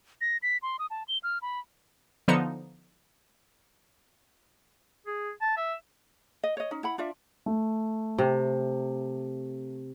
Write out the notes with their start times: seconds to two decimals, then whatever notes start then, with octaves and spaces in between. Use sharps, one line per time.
0.21 A#6
0.43 B6
0.62 C6
0.79 D#6
0.90 A5
1.08 G7
1.23 F6
1.42 B5
2.28 D3 F3 B3 D#4 C#7 E7
5.07 G#4
5.42 A5
5.57 E5
6.43 D#5
6.57 C#5 D#5
6.71 C#4 D#4
6.83 E4 F#5 B5
6.98 D4 F4 D5 E5
7.46 A3
8.18 C3